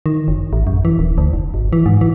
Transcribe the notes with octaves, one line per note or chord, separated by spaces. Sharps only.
D#3
F#1
A1
F#2
E3
D#1
D2
F1
G#1
E3
G#2
E3